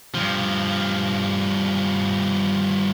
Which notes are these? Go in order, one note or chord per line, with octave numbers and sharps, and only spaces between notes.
G2 F3